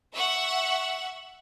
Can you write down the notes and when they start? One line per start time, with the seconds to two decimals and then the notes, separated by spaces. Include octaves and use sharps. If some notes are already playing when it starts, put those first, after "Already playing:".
0.15 E5 F#5 C#6